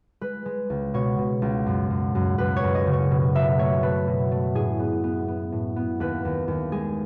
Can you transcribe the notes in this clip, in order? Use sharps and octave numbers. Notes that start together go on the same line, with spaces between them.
G#3 B4
G#3
C#2
B2 C#5
B2
C#2
F#2
F#2
F#2
F#2 B4
C#5
F#2
D#5
C#3
C#5
B2
B2 E5
A3 C#5
A3 B4
B2
A3
A2 G#4
B3
B3
B3
A2
B3
D#2 B4
D#2
D#2
G#3 G#4